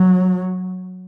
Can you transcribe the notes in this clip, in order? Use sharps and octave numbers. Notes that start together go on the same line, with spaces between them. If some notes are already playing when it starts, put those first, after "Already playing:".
Already playing: F#3